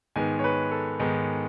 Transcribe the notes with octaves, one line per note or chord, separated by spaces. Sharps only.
G#2 D#3 G#3 B3 G#5
C#5
B4
A4
G#2 D#3 G#3 B3